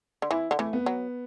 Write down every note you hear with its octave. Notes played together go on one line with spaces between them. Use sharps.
D3
E3 E4
D3
E3 A3
B3
F#3